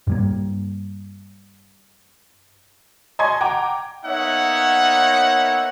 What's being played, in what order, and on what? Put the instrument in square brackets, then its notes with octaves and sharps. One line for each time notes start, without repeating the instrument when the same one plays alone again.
[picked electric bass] G2 G3 A#3
[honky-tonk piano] D#5 G#5 A5 C6 C#6 G#6
F#5 G5 A#5 D6
[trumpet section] A#3 B3 D#4 C#5 E5 F#5